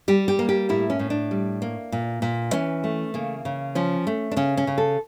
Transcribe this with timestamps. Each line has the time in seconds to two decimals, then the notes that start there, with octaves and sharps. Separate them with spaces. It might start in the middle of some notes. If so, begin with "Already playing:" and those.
0.08 G3 G4
0.28 G4
0.39 A#3
0.49 G4
0.69 A2 E4
0.90 C#4
0.99 A2
1.10 D4
1.31 G3
1.62 A#3
1.92 A#2
2.22 A#2
2.53 E3 C#4
2.84 A3
3.14 C#3 A#3
3.45 C#3
3.75 F3 C#4
4.07 A3
4.31 D4
4.36 C#3 C#4
4.57 C#4
4.67 C#3
4.78 A4